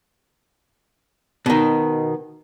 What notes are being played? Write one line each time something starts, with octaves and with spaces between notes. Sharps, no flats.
B2 D#3